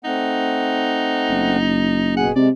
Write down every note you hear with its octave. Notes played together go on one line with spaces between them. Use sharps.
A3 C4 D#4 F#5
F#1
B2 G#4 F#5 G#5
C3 G#3 D5